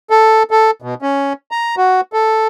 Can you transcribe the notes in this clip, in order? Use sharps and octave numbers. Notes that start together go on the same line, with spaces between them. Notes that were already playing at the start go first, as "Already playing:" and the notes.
A4
A4
B2
C#4
A#5
F#4
A4